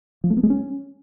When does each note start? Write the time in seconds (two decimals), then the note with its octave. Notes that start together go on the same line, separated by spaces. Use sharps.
0.24 F3
0.30 A3
0.37 B3
0.43 G#3
0.50 C#4